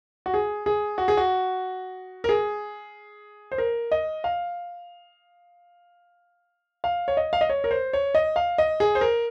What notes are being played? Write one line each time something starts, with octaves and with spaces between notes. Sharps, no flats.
F#4
G#4
G#4
F#4
G#4
F#4
A#4
G#4
C5
A#4
D#5
F5
F5
C#5
D#5
F5
D#5
C#5
A#4
C5
C#5
D#5
F5
D#5
G#4
C5
A#4